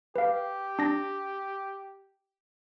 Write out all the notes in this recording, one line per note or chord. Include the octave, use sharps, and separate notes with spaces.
G4 B4 F5
D4 A#6